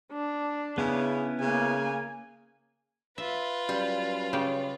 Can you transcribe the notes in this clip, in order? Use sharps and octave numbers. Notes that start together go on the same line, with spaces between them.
D4
C#3 B3 C#4 E4
C#3 A#3 G#5
F4 B4 E5
F#2 G3
C#3 G4